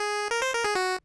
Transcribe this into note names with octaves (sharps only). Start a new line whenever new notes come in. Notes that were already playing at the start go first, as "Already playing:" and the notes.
Already playing: G#4
A#4
C5
A#4
G#4
F#4